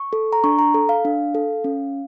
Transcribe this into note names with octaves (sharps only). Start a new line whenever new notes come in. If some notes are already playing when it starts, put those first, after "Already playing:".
Already playing: C#6
A4
A#5
D4 C#6
A#5
A4
F5
D4
A4
C#4